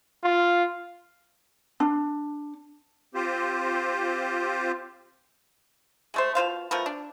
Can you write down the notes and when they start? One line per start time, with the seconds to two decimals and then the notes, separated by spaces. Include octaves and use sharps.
0.24 F4
1.80 D4
3.14 C4 F4 G4 C5
6.14 G#3 A3 C5
6.35 B2 F4 C5 F5
6.71 F3 A3 B3 A#4
6.86 D4